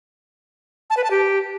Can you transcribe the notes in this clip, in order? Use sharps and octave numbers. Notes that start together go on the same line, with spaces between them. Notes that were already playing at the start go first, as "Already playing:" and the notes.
A5
B4
A5
G4